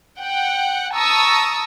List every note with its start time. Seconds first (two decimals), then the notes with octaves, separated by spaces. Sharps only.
0.17 F#5 G5
0.94 A5 A#5 C#6 D#6 E6